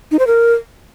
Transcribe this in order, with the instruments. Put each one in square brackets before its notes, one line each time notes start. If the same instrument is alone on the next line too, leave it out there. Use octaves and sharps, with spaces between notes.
[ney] D#4
C5
A#4